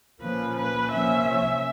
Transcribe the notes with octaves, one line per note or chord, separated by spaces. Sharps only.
A#2 F3 A#3 C#4 B4
B4
C3 F3 A#3 C#4 E5